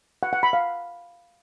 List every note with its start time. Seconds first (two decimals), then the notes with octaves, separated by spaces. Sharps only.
0.23 F#5
0.33 F#5
0.43 B5
0.53 F5